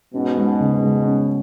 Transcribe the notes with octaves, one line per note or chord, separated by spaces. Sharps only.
G#2 B2 C#4
G#3
C#3
G#3
C#4